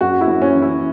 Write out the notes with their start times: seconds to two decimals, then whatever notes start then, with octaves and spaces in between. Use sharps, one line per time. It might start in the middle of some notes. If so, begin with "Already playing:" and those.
0.01 F#2 F#4
0.21 E4
0.27 F#2
0.42 C#4
0.55 E3
0.62 E4